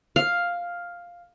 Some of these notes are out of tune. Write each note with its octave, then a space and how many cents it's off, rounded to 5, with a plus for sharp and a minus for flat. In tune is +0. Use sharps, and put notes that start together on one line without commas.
F5 +5